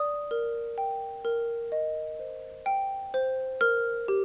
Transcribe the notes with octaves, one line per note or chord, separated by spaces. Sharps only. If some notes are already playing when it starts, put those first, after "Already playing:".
Already playing: D5 D#6
A#4
G5
A#4
D#5
C5
G5
C5
A#4 F6
G4